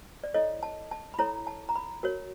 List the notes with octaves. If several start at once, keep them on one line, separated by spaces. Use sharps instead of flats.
D5
E4 A4 C#5 D#5
A5
A5
B5
E4 A4 C#5 A#5
A5
A#5
B5
F#4 A#4 C#5